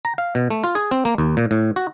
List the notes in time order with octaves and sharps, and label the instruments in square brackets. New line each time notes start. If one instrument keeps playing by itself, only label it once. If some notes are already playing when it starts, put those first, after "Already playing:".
[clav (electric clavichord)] A#5
F5
B2
A3
F4
G#4
C4
A#3
D#2
A#2
A2
F#4